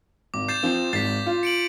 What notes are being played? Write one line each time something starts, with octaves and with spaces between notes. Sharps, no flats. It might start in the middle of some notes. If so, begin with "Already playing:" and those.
G#1 D6
G6 A6 C7 E7
F3 C4
G#1 G#2 A6 B6 C7
F4
C#7 D7 F#7